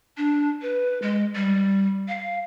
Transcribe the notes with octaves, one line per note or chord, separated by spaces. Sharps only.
D4
B4
G#3
G3
F5